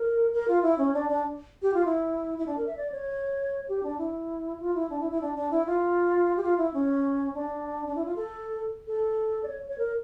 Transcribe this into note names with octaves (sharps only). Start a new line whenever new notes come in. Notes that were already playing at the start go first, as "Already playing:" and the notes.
Already playing: A#4
A#4
F4
E4
C#4
D4
D4
G4
F4
E4
E4
D4
A#4
E5
D5
C#5
G4
D4
E4
F4
E4
D4
E4
E4
D4
D4
E4
F4
G4
F4
E4
C#4
D4
D4
E4
F4
A4
A4
D5
C#5
C#5
A#4